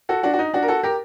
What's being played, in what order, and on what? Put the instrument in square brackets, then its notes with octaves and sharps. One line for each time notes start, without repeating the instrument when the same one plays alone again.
[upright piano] F#4 A4
D4 F#4
F#4
D#4
D4 F#4
A#4
F#4 A4
G4 A#4